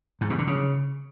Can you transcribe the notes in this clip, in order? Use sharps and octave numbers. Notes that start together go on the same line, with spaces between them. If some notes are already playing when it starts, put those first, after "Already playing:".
G#2
B2
D3
C#3